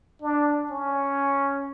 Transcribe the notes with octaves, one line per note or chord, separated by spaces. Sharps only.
D4
C#4